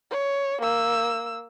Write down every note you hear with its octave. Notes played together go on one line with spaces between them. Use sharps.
C#5
A#3 E6